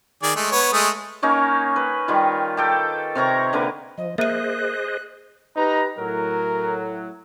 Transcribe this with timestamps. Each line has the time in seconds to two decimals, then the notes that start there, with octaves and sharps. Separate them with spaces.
0.23 D#3 G#4 D5
0.35 G#3 A3
0.52 B3 C#5
0.73 G#3 A3 D#6
1.22 A#3 C#4 D#4 C#5
1.76 B4
2.08 D#3 G3 F4
2.57 G4 A4 G5
3.15 C3 A#4 C#5 A#5
3.53 D3 A#3 B4
3.98 F3 D#5
4.18 A#3 G#4 C5 D#5 E5 F#6 D#7
5.56 D#4 G4 B4 A#5
5.98 A2 F#3 A#4